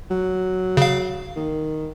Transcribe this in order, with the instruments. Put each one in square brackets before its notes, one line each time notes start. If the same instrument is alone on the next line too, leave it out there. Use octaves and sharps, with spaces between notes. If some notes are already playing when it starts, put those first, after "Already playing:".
[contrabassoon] F#3
[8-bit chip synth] C#3 F5
[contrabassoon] D#3